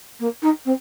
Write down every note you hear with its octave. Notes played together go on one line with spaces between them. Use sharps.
A#3
D#4
C4